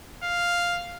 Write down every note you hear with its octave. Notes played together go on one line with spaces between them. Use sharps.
F5